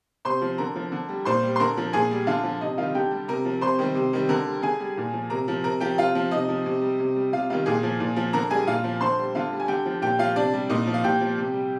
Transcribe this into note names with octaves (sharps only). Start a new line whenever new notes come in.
C3 C5 C6
F3
D3 A#4 A#5
F3
D3
G3
A#2 C5 C6
G3
C6
D3 A#4 A#5
F3
A#2 G#4 G#5
G3
D3 F4 F5
F3
C3 D#4 D#5
D#3 G3 F4 F5
D3 G4 G5
G3
C3 A#4 A#5
F3
C3 C5 C6
D#3 G3
C3
D#3 G3
D3 A#4 A#5
G3
D3 G#4 G#5
G3
A#2
F3
C3 A#4 A#5
F3
C3 A#4 A#5
F3 G4 G5
C3 F4 F5
F3
C3 D#4 D#5
F3
C3
G3
C3
G3
C3 F4 F5
D#3 G3 F4 F5
A#2 G#4 G#5
F3
A#2
F3
D3 A#4 A#5
G3 G#4 G#5
A#2 F4 F5
F3
D3 C5 C6
G3
D3 F4 F5
G3
G#5
D3 G4 G5
F3
A#2 G4 G5
F3 F4 F5
C3 D4 D5
G3
A#2 D#4 D#5
F3
F5
A#2 G4 G5
F3
C3
G3